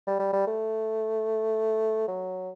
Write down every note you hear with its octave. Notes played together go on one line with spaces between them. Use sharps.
G3
G3
G3
A3
F#3